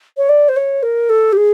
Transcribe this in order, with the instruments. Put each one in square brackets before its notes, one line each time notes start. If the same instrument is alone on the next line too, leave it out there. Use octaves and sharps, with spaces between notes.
[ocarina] C#5
D5
C5
C#5
A#4
A4
G4
G#4